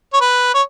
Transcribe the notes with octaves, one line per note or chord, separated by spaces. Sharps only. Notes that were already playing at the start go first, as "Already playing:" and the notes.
C#5
B4
C#5